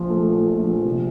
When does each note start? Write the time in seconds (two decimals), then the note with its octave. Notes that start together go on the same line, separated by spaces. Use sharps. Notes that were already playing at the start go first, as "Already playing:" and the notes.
Already playing: A#1 F3
0.10 A3
0.29 A#2
0.48 A#1
0.67 F3
0.85 C3